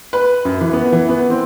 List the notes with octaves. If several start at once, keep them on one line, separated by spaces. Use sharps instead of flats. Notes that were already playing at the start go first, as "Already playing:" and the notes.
B4
F#2
E3
B3
E3
B3
C4